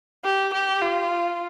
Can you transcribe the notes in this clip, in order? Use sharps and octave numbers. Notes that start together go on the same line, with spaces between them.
G4
G4
F4